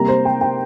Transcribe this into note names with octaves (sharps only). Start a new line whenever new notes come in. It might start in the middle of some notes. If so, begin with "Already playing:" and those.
Already playing: C3 G3 A#3 A#5
C5
G5
G5